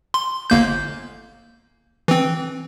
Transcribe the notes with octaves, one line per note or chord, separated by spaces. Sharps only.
C6
G1 A#3 G6
E3 C4